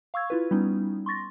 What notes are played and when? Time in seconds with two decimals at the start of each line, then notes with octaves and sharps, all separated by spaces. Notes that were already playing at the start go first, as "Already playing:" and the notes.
0.14 F5 C#6 E6 G#6
0.30 E4 F4 B4
0.51 G3 B3 C#4 D#4
1.06 C6 C#6 A6 A#6